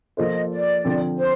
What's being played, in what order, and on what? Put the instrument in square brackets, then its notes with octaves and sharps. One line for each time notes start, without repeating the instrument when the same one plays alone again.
[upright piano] F3 A#3 F4 A4 C5 [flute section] D#5
[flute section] D5
[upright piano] D3 F3 C4
[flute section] C5